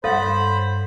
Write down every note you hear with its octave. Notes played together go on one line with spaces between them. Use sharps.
G2 A4 C5 C#5 F5 F#5 B5 A6